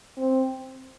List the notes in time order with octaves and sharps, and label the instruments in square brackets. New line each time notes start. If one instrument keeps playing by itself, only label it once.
[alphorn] C4